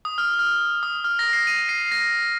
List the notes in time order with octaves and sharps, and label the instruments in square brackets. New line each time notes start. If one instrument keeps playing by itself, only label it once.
[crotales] D#6
F6
F6
D#6
F6
A#6
C7
D#7
C7
A#6